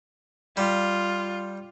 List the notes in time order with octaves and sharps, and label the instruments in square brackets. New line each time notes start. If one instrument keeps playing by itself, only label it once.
[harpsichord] G3 [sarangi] F4